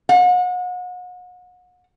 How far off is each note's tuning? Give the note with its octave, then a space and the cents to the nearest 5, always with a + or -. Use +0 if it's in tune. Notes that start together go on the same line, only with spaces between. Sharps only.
F#5 -35